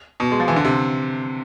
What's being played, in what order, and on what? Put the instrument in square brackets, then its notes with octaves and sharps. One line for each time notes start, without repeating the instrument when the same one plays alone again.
[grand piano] B2
G#3
F3
E3
D3
C3